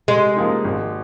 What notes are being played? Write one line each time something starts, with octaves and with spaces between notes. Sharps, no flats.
C3 G#3
F3 A#3 D#4
G#1